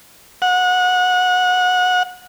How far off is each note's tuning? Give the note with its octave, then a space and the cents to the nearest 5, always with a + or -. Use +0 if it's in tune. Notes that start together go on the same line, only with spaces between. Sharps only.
F#5 -25